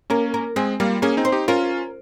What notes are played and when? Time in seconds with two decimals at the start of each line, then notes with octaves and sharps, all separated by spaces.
0.10 A#3 C#4 A#4
0.34 A#4
0.56 G#3 C4 G#4
0.80 G3 A#3 F4
1.02 A#3 C#4 G#4
1.17 C4 D#4
1.25 C5
1.32 D#4 G4
1.48 C#4 F4 A#4